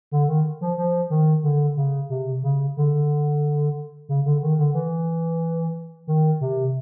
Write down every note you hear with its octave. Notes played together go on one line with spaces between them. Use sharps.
D3
D#3
F3
F3
D#3
D3
C#3
C3
C#3
D3
C#3
D3
D#3
D3
E3
D#3
C3